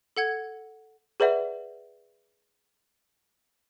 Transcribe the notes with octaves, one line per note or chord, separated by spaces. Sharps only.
A4 F#5 G#6
G#4 B4 D5 E5 F#5